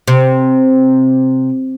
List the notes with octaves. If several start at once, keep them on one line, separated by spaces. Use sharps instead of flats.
C3